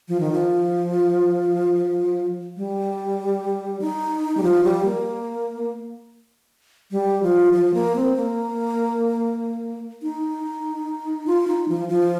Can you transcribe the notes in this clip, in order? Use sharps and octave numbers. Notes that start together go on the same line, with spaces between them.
F3
D#3
F3
G3
D#4
G3
F3
G3
A#3
G3
F3
F3
A#3
C4
A#3
D#4
F4
D#4
F3
F3